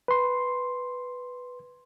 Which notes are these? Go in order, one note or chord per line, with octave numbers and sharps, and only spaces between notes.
B4 C6